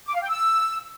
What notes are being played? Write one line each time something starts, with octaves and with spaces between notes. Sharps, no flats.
D6
F5
G5
E6